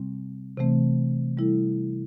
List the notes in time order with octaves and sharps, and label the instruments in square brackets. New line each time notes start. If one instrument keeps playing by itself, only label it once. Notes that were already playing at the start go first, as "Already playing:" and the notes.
Already playing: [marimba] C3 G3 C4
C3 E3 A3 C4
G3 E4 A4